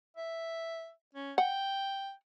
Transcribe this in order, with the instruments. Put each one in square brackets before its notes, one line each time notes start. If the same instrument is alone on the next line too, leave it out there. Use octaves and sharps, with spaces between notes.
[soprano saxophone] E5
C#4
[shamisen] F#5 [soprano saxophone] G5